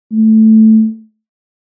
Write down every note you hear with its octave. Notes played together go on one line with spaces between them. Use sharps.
A3